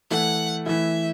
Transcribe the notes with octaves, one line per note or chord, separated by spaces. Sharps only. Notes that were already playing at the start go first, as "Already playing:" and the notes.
E3 A3 E4 A4 F#5
E3 A3 E4 E5